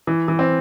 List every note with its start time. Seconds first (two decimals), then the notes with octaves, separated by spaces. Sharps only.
0.07 E3
0.28 E3
0.39 C4